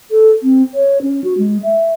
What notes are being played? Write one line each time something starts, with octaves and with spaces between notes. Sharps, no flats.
A4
C4
C#5
C#4
F#4
G#3
E5